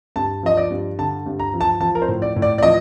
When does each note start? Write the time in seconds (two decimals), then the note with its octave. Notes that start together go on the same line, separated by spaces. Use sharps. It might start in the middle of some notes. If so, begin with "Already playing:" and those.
0.16 G2 A5
0.43 F3 D#5
0.57 D5
0.71 G2
0.98 D3 A5
1.26 G2
1.39 A#5
1.54 F3
1.61 A5
1.80 F3 A5
1.95 A#4
2.02 C5
2.08 A2
2.22 D5
2.36 A2
2.42 D5
2.58 D5
2.63 F3 D#5